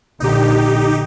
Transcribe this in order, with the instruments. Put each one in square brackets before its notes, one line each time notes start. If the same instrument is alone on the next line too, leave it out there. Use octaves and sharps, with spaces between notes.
[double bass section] A#1 D3 [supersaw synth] D#4 G4